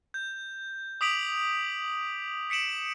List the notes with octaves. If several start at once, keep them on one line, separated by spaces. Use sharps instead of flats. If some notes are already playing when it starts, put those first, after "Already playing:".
G6
D6 D#6 B6 D7 F7 F#7
B6 C#7 D7 E7 F#7